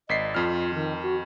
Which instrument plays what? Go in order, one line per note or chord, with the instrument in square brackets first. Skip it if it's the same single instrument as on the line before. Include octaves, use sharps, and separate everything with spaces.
[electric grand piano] G#1 B6 C7 [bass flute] D#5
[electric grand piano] F2 F6 [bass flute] F4
[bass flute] D#3
F#4